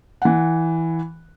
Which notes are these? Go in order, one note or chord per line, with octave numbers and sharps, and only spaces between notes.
E3 F#5